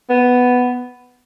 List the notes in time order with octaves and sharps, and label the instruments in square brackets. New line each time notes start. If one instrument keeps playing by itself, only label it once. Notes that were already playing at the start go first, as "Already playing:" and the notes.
[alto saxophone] B3